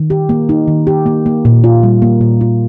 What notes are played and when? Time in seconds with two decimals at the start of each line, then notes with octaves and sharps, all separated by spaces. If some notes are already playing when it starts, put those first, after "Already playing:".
Already playing: D#3
0.10 G4
0.29 A#3
0.49 D#4
0.68 D#3
0.87 G4
1.06 A#3
1.26 A#3
1.45 A#2
1.64 F4
1.83 G3
2.02 A#3
2.21 A#2
2.41 F4